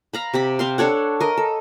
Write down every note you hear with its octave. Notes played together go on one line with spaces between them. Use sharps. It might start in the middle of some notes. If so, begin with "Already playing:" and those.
F5 A#5 B5
C3 G4 B5
C4 F5 C6
D4 A4 C#5 F#5
A#4 D#5
A4